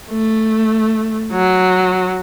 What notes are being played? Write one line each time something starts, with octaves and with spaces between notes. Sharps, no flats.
A3
F#3